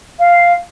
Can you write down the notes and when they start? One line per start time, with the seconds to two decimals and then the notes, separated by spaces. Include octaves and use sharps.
0.18 F5